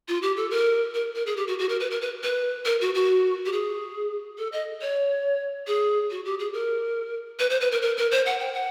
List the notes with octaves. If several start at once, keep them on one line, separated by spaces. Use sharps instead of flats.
F4
G4
A4
A#4
A#4
A#4
G#4
G4
F#4
F#4
A#4
B4
A#4
B4
B4
A#4
F#4
F#4
G4
G#4
A4
D#5
C#5
G#4
F#4
G4
G#4
A#4
B4
C5
B4
A#4
A#4
A#4
C5
F#5
G5
F#5